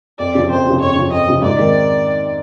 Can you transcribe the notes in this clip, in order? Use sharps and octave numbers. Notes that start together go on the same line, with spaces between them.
F2 D5
C#3 F3
F2 C5
C#3 F3
F2 C#5
C#3 F3
F2 D#5
C#3 F3
G#2 D5
D#3 G#3 C4